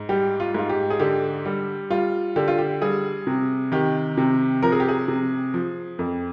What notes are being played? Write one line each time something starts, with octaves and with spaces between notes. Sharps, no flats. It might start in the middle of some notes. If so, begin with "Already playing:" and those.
Already playing: G#2
G3 G4
F4
G#2 F4
G4
G#4
D3 G4
G3
G3 F4
D3 G4
F4
G4
G3 G#4
C3
D#3 G4
C3
F3 A#4
G#4
G4
G#4
C3
F3
F2